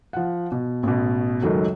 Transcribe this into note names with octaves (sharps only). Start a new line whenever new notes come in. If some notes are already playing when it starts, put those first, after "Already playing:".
F3 F#5
B2
A1 B2
C#2 F#2 D#3 F#3 A3